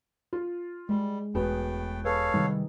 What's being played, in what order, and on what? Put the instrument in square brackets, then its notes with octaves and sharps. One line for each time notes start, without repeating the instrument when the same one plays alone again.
[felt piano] F4
[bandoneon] G3 [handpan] G#3
[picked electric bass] E1 [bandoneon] A2 G5 [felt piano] B3 F#4 [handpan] G#4
[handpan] G#4 B4 [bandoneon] A4 C#5 F5
[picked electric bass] C3 D#3 G3 [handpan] D#4